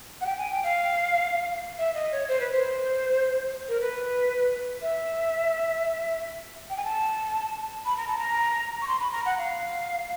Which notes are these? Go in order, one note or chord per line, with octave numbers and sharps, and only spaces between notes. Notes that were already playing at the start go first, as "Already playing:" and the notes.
F#5
G5
G#5
G5
F5
E5
D#5
C#5
C5
B4
C5
A#4
B4
E5
G5
G#5
A5
B5
A#5
A5
A#5
C#6
C6
B5
A#5
F#5
F5